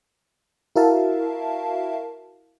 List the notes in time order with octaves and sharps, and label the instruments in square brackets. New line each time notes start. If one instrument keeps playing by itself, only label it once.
[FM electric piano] E4 F#4 A#4 E5 F5 A5